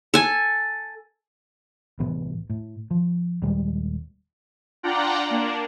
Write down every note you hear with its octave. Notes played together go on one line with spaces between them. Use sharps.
A4 G#5
C2 A2 E3 B3
A2
F3
D#1 G3 G#3
D4 F4 D5 F#5 G5 A#5
A#3 D4